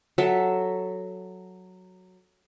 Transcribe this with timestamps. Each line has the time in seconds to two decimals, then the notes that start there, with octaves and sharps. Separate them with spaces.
0.18 F#3 A4 E5